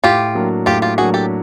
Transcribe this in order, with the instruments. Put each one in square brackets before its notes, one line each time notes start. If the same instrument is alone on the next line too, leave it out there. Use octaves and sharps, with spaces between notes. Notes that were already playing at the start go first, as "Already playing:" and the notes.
[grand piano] A2 [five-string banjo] F4 G4
[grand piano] F#3 A#3 D4
[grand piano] A2 [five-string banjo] F4 G4
[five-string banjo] F4 G4
[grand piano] F#3 A#3 D4 [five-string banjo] F#4 G#4
[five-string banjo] G4 A4